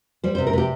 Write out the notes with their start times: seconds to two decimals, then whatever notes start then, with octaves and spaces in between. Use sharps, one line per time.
0.24 G3 C5
0.35 C5
0.38 C3
0.47 A#4
0.53 C3 G4